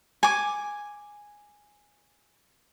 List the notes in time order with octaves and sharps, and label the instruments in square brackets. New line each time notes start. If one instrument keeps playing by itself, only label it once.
[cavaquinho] G#5 D6